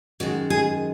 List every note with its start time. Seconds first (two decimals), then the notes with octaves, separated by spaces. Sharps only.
0.20 F#2 D#3 G#3 F#4
0.50 G#4